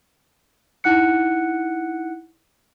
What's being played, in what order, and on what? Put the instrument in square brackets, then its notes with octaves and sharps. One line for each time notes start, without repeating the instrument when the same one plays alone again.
[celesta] D#4 E4 F#5 F#6 C#7